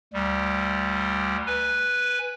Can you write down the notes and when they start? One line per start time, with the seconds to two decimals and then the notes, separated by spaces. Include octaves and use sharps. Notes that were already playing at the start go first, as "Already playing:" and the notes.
0.13 D2 G3
1.46 B4 G#5